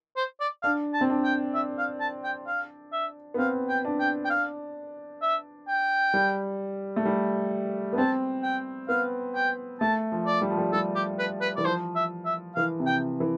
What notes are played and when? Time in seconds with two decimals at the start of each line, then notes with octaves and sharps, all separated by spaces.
0.17 C5
0.41 D5
0.63 D4 F5
0.94 A5
1.01 C4
1.10 D4
1.24 G5
1.55 E5
1.78 F5
2.00 A5
2.24 G5
2.47 F5
2.93 E5
3.34 B3
3.38 C4 F5
3.69 G5
3.85 D4
4.00 G5
4.25 G5
4.30 F5
5.22 E5
5.68 G5
6.14 G3
6.96 A3
7.05 G3
7.93 B3
7.98 C4 A5
8.43 G5
8.89 B3 F5
9.35 G5
9.81 A3 A5
10.12 F3
10.27 D5
10.42 G3
10.50 F3
10.58 G3
10.73 G3 A4
10.96 G4
11.19 B4
11.42 B4
11.57 E3 D5
11.65 F3 C5
11.96 E5
12.26 E5
12.56 E3 F5
12.80 C3
12.87 G5
13.20 E3